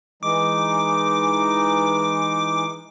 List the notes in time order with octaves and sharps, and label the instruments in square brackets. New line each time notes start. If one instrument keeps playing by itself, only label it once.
[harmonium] E3 G#3 D#4 [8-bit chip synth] D6